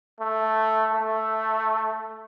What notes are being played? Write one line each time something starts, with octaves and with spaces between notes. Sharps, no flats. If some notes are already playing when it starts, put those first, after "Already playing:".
A3
A3